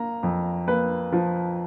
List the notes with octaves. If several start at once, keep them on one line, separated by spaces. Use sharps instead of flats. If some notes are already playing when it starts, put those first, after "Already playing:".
Already playing: A#3 A#5
F2
A#3 B4
F3